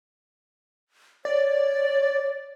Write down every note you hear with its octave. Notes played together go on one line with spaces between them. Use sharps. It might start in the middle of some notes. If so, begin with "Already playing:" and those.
C#5 D5